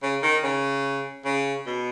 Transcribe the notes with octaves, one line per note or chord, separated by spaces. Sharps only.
C#3
D#3
C#3
C#3
B2